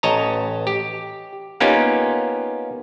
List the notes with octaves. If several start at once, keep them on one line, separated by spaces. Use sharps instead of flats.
A1 C#5 D#5 A5 A#5
G4
A#3 B3 C#4 D#4 F4 G4